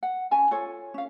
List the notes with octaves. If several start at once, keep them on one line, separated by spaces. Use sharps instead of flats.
F#5
C#4 G#5 A5
F4 A4 C#5
C#4 F5